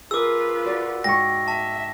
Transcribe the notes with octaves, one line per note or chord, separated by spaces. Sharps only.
F4 G#4 A#4 B4 D6 E6
F#4 D5
G#2 G5 C#6 A#6
E5 A5